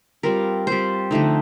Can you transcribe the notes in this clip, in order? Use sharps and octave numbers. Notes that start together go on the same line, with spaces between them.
G3 C4 F4 A#4
G3 C4 F4 C5
D3 F3 A3 D#4